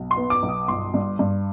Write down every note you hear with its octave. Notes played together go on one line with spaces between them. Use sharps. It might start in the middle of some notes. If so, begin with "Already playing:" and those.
Already playing: B1
C6
B3
D6
B1
D#6
G1 C6
G2
G2